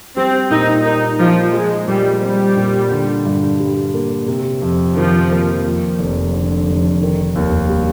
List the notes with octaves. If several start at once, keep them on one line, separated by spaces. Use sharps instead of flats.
G3 C4
A#2 D#4
A#3 D#4
F3 D#4
F3 G#3
A#2 G3
G3 C4
A#2
D3
G2
G3
A#3
C3
F2
D#3 F3
A#3
F2
F1
D3
F1
D#3
D#2
G3